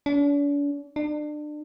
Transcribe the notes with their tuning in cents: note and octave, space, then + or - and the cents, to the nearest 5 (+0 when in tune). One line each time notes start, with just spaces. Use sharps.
D4 -45
D4 +30